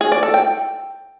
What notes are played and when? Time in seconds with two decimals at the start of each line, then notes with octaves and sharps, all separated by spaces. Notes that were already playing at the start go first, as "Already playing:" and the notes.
0.01 G#4
0.12 D5
0.23 A4
0.34 G5